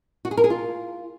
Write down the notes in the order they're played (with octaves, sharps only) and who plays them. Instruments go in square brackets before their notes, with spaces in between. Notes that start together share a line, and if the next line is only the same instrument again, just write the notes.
[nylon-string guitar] F#4
G#4
A#4
G#4
F4